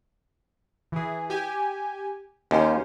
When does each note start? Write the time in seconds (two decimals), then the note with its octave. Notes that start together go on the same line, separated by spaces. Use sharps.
0.92 E3 G#4
1.30 G4 G#5
2.51 D#2 C#4 C5